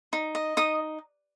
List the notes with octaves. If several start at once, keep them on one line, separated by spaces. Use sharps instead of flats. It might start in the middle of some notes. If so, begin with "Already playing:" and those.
D#4
D#5
D#4 D#6